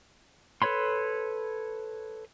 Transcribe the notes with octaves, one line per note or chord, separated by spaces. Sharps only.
A4 B4 C#5 B5 C6